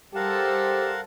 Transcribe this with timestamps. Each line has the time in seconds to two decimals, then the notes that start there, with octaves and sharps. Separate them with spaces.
0.15 G3 G4 A4 A#4 C5 F5 F#5